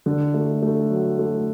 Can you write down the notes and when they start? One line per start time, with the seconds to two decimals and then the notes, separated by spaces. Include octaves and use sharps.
0.06 D3
0.34 A3
0.62 A3
0.90 F#3
1.19 A3